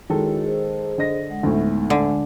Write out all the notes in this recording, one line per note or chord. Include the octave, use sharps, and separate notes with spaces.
D#3 G#3 E4 F#4 A4 C#5
G#4 C5
D3 D#5 A#6
G#3 F#5
D2 A2 G#3 B3 D#4
D3 G#3 G#5